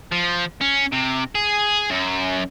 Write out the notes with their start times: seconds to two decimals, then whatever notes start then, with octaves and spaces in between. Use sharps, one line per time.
0.12 F3
0.61 C#4
0.92 C3
1.35 G#4
1.90 F#2